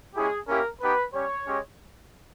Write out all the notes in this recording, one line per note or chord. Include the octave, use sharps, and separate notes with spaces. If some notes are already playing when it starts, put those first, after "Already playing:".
G#3 C#4 E4 G4 G#4
A#3 C#4 E4 G4 A#4
B3 D#4 G4 B4
G3 C#4 G4 C#5
G#3 C#4 G4